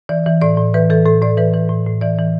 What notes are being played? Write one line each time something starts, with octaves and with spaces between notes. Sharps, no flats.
E3 D5
E3
A2 D5
A2
E3 B4
E3 A4
A2 A4
A2 D5
E3 B4
E3
A2
A2
E3 D5
E3